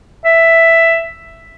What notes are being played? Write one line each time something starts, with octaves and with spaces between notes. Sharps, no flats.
E5